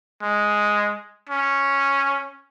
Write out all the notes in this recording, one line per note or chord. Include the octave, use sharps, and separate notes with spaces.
G#3
C#4